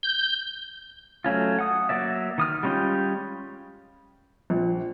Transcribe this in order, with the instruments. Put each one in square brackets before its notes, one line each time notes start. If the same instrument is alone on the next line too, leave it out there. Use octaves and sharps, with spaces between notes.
[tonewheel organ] G6
[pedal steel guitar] F#3 A3 C#4 F4
F#5 D#6
F#3 A#3 D5 E5
D#3 D#6 F6
G3 G#3 C#4 F4 G5
[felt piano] A#1